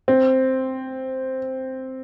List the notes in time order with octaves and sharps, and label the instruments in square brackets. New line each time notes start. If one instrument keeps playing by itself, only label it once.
[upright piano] C4